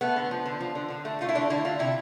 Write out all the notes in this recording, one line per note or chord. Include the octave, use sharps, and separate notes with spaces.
A3 B3
D3
F3
D3
F3
D3
D3
A3
A3 F4
E4
D3 D4
D3 E4
D3 F4
C3 E4